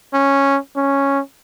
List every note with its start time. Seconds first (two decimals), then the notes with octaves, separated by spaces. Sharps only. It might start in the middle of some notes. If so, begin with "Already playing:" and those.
0.13 C#4
0.76 C#4